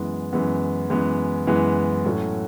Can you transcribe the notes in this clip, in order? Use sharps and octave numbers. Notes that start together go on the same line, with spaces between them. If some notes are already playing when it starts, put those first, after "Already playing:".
Already playing: F#2 E3 G#3 B3
F#2 E3 G#3 B3
F#2 E3 G#3 B3
F#2 E3 G#3 B3
A2 F#3 A3 C#4 F#4